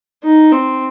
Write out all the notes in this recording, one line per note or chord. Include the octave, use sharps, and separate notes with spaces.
D#4
C4